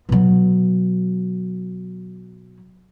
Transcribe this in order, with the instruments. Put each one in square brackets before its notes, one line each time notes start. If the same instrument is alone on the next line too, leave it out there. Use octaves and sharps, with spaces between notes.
[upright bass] B2 F#3